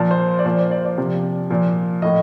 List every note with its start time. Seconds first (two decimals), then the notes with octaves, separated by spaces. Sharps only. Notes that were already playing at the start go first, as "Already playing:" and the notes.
Already playing: A#2 F3 A5
0.11 C5
0.39 D5
0.45 A#2 F3 C5
0.58 D5
0.71 D5
0.79 C5
0.85 D5
0.98 C3 F3
1.50 A#2 F3
2.02 A2 F3 D#5